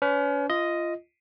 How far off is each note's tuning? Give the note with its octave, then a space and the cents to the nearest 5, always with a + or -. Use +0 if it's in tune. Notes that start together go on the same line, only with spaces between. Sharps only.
C#4 +35 B4 +40
F4 -20 D#5 +5